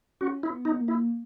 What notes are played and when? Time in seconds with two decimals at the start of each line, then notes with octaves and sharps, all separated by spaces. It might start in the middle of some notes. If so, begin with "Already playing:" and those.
0.21 C#4 F#4
0.43 E4
0.51 B3
0.65 D#4
0.80 A#3
0.88 E4